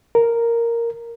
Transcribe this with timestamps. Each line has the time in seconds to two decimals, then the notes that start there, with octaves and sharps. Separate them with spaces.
0.15 A#4